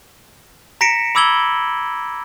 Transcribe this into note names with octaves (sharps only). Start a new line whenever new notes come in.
A#5 A#6 B6 C#7 D7 E7
B5 D6 E6 G#6 F#7 G7